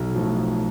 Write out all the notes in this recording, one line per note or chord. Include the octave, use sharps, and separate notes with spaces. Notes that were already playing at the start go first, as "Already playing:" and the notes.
Already playing: B1
A2 F3